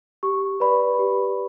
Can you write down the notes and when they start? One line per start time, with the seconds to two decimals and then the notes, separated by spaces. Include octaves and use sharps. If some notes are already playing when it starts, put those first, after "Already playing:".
0.23 G4 C#6
0.60 B4 D5 B5
0.99 G4